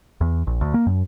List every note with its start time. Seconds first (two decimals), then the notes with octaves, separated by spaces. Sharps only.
0.21 E2
0.47 A#1
0.61 D2
0.74 A#3
0.86 F#2